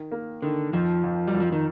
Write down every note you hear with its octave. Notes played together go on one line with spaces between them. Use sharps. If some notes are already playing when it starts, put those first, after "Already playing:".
Already playing: D#3
A#3
D3 D#3
F2 F3
F2
G3
F2
F3
D#3